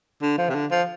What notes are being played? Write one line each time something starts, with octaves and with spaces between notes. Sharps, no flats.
D3
F3
C3
D3
F3